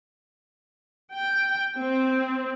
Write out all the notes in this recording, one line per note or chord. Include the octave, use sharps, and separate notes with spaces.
G5
C4